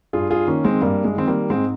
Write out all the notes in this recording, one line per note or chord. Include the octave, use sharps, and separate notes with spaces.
G2 F4 G#4
F4 G#4
D#3 A#3 C#4
G#3 C4
G2 G3 A#3
G#3
D#3 C4
G3 A#3
G#2 G#3 C4